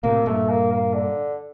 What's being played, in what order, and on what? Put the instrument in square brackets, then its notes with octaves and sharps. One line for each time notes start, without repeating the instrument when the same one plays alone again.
[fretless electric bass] A2 C3 [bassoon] A#3
[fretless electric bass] G2 A#2 [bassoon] A3
[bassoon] A#3
A#3
D3